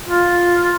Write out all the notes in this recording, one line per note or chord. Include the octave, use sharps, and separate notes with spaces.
F4